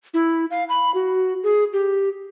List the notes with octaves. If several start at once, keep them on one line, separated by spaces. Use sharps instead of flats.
E4
F5
B5
F#4
G#4
G4